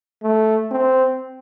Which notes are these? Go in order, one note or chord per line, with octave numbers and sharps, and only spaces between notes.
A3
C4